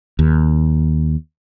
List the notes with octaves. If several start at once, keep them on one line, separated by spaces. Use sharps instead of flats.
D#2